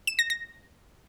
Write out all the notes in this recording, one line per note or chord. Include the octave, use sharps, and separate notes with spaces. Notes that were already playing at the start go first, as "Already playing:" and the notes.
E7
A#6
A#6